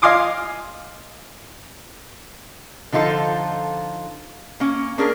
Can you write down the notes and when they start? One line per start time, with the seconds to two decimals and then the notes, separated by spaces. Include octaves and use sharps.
0.02 D#5 F5 G#5 C6 D6 D#6
2.92 D3 F3 D#4 F4 A4
4.60 A#3 C#4
4.98 A#3 C#4 D4 G#4 A#4